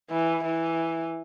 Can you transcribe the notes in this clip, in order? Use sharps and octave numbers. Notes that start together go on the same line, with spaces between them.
E3
E3